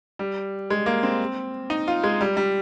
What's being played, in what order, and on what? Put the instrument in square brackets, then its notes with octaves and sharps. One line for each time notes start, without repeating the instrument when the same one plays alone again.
[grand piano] G3
G#3
A#3
C4
D#4
F4
G#3
G3
G3